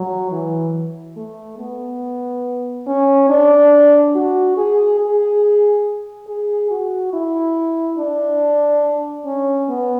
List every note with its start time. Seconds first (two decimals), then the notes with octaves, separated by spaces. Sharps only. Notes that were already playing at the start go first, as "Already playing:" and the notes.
Already playing: F#3
0.31 E3
1.17 A3
1.59 B3
2.87 C#4
3.29 D4
4.15 F#4
4.57 G#4
5.00 G#4
6.27 G#4
6.70 F#4
7.13 E4
7.98 D4
9.25 C#4
9.69 B3